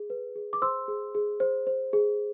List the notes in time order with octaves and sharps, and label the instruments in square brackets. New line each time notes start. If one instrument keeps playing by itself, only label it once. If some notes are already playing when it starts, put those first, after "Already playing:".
Already playing: [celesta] G#4
B4
G#4
D6
C5 C6 E6
G#4
G#4
C5
C5
G#4